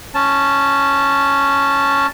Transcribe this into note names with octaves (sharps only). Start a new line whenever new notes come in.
C#4 A5